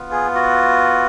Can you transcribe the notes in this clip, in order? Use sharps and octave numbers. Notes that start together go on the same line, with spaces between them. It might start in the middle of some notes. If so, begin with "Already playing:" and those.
Already playing: B3 F4
G#4
F#4